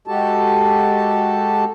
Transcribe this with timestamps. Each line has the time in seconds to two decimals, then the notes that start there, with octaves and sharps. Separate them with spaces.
0.08 G#3 F#4 G4 A4 A5